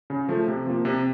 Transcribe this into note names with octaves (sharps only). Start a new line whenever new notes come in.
C#3
F3 A3
C3
F3 A#3
C3